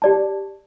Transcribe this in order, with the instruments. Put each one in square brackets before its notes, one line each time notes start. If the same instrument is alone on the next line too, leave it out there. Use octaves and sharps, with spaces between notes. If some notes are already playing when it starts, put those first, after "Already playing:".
[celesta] G4 D5 A5